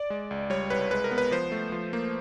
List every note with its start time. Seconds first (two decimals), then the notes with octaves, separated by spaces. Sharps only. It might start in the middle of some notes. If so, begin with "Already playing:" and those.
Already playing: D5
0.10 G#3
0.31 C#2
0.50 G3 C#5
0.70 C2 B4
0.91 G#3 B4
1.04 A#4
1.11 B3
1.18 B4
1.31 F3 C5
1.52 A3
1.72 F3
1.93 A#3